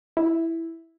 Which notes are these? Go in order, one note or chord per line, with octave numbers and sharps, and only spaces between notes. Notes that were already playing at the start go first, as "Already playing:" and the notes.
E4